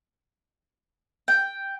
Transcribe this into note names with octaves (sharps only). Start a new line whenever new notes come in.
G5